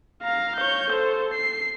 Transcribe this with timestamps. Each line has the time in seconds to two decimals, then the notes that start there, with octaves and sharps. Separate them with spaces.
0.22 F5 A#5
0.56 C#5 G6
0.90 A4 C5
1.34 C7